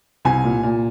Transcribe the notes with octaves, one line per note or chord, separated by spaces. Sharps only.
C2 G#5
A#2
A#2